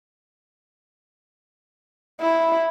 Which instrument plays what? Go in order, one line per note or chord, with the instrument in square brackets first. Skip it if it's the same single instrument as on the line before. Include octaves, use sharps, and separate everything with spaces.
[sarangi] E4